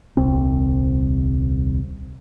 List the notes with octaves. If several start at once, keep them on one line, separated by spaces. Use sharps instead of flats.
D#1 C2 C4